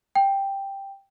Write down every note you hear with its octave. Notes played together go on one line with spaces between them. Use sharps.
G5